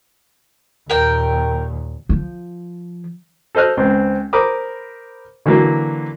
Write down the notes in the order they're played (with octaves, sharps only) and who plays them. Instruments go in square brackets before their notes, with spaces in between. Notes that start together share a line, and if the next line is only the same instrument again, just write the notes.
[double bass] D#2 A#2 [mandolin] A#4 G5
[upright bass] F3
[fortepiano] A4 C5 D#5 F6 F#6
C#2 C4
A#4 C5 B5 D6 D#6
D3 E3 F#3 A#3